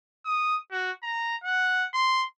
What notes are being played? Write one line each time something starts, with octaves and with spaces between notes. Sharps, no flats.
D#6
F#4
A#5
F#5
C6